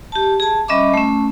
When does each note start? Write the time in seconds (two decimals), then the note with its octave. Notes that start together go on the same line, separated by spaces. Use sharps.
0.12 G4 A5
0.40 G#4 A5
0.68 G3 C#4 D#5 E5 B5 D6
0.94 A3 C#4